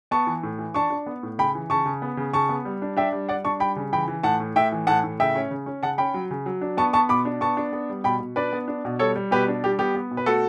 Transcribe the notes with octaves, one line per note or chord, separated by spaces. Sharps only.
B3 A5 C#6
E3
A2
E3
D4 A5 C#6
D4
B3
A2
C#3 G5 B5
E3
C#3 A5 C#6
C#3
B3
C#3
C#3 A5 C#6
B3
G3
D4
D4 E5 G5
G3
G3 D5 F#5
D4 A5 C#6
G3 G5 B5
C#3
E3 G5 B5
E3
A2 F#5 A5
A2
A2 E5 G5
E3
A2 F#5 A5
A2
C#3 E5 G5
C#4
C#3
C#4
C#3 F#5 A5
C#4 G5 B5
F#3
C#3
F#3
D4
B3 A5 C#6
B3 A5 C#6
B2 B5 D6
D4
B3 A5 C#6
D4
B3
G3
B2 G5 B5
B2
D4 B4 D5
B3
D4
B2
G3 A4 C#5
G3
B2 G4 B4
D4
G3 G4
B3 G4
B3
B2
B4
A3 F#4 A4